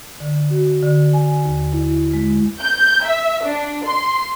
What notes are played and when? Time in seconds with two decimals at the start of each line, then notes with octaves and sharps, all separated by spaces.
0.20 D3
0.50 F#4
0.83 D3
1.13 G#5
1.46 D#2
1.73 E4
2.14 G#3
2.61 G6
3.03 E5
3.44 D4
3.85 C6